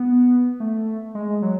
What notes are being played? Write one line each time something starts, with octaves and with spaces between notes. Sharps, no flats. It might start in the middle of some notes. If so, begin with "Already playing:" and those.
Already playing: B3
A3
G#3
F#3